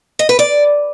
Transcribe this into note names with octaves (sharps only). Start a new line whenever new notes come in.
D#5
B4
D5